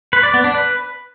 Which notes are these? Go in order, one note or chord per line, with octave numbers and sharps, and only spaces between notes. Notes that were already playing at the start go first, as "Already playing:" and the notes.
B4
D5
B3
D4
B4